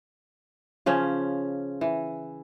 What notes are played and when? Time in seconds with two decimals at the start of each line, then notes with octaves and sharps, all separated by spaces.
0.86 C#3 F3 C#4
1.81 E3